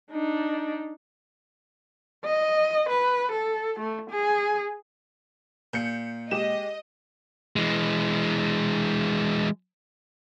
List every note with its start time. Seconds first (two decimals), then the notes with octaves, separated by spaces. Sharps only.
0.11 D4 D#4
2.25 D#5
2.89 B4
3.32 A4
3.79 A3
4.10 G#4
5.73 A#2 G6 C#7
6.31 G#3 G4 D#5 E7
7.56 E3 G#3